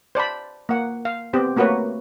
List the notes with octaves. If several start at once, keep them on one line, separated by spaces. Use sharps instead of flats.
C5 D5 A5 B5
A#3 F#5
F5
B3 C4 G4
A3 A#3 F#4 A#4 B4 C#5